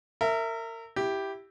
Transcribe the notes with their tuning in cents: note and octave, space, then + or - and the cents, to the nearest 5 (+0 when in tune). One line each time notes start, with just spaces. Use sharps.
A#4 -30 E5 +0
E4 +0 G4 +0